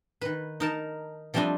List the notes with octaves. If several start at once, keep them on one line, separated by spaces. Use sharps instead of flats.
D#3 B4
D#4 A#4 A5
F3 G3 A3 C4 D4 D#5